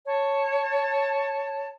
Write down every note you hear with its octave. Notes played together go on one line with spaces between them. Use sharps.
C#5 A5